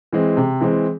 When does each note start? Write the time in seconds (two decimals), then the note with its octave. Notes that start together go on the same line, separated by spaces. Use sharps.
0.13 E3 G#3 C4
0.37 C3
0.61 E3 G#3 C4